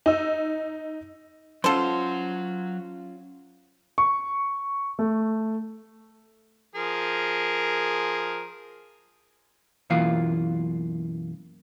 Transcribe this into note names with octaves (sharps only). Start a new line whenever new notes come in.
D#4 E6
F#3 C#4 F4 A4 C5 F#5
C#6
A3
F3 G#4 A#4
B1 F#2 E3 A#3 F4 F5